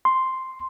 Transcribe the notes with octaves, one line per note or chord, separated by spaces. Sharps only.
C6